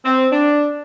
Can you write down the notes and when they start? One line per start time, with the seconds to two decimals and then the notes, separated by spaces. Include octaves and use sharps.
0.05 C4
0.32 D4